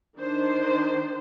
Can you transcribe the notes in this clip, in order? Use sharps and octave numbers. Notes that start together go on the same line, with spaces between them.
D#3 D4 C5